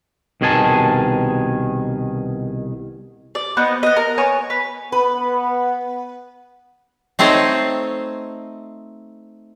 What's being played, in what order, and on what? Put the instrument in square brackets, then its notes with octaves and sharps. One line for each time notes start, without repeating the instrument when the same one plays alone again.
[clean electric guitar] C2 B2 D#3 G#4 G#5 A5
[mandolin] D5
B3 C4 D#4 B4
B3 D#5
A#4
B3 C#5 G#5 C#6
B4
[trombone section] B3 [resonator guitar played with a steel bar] B4
[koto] A3 C4 D#4 C5 C#5 D#5